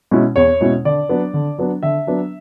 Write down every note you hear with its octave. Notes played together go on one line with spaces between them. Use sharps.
B2 G#3 C#4 E4
E2 C#5
B2 G#3 C#4 E4
D3 D5
F#3 B3 D4
D3
F#3 B3 D4
D3 E5
F#3 B3 D4